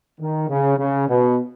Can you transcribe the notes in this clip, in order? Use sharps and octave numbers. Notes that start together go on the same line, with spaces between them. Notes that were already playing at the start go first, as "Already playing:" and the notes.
D#3
C#3
C#3
B2